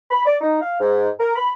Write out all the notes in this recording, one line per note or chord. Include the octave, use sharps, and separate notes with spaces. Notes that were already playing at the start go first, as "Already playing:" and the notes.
B5
D5
D#4
F5
G#2
A#4
B5